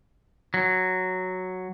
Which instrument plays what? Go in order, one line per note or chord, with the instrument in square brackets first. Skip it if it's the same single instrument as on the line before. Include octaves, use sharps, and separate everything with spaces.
[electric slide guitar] F#3